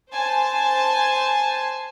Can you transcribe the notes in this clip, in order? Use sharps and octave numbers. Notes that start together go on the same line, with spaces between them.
C5 G#5 A5